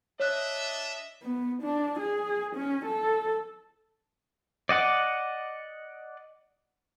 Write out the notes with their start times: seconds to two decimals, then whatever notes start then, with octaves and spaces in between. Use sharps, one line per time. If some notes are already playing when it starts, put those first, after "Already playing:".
0.20 D4 C#5 D#5 E5 F#6
1.22 B3
1.62 D4
1.99 G#4
2.55 C#4
2.85 A4
4.69 D5 D#5 F#5 D6